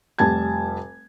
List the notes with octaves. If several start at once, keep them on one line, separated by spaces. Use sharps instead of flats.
F1 G3 A5 G#6